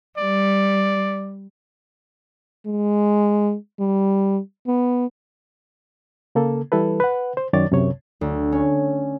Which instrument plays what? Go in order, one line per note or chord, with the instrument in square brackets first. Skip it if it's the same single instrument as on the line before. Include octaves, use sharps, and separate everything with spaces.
[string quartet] G3 [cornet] D5
[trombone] G#3
G3
B3
[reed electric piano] C#3 A#3 A4
E3 G3 E4 A4 B4
B4 F#5
C5
F#2 D#3 C#5 D5 D6 A6
C2 F#2 C3 C#5
[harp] D2
C#4